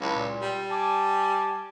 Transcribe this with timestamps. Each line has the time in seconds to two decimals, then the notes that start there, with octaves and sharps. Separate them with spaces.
0.01 C#2 F#3 D4 E4
0.16 A#2
0.42 G3
0.71 G#5 A5 D6